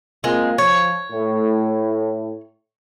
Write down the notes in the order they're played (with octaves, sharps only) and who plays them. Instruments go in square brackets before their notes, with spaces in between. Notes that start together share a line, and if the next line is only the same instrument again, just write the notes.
[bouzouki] G#3 [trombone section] A#3 C4 F4
[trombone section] F3 [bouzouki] C#5
[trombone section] A2